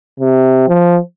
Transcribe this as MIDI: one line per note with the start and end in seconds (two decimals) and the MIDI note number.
0.20 0.65 48
0.68 0.98 53